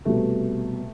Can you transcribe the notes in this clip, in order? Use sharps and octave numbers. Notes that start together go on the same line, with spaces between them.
C2 B2 A3